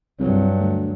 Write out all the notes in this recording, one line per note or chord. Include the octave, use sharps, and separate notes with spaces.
C2 G2 F#3
D2